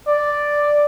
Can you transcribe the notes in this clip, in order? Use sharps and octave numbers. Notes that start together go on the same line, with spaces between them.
D5